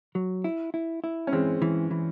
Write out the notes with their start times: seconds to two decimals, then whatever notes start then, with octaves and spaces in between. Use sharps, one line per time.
0.15 F#3
0.44 E4
0.74 E4
1.04 E4
1.27 C#4
1.32 E3 G#3 C4
1.62 E3
1.91 E3